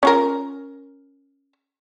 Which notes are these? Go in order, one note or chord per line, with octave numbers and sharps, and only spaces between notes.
C#4 F4 A#4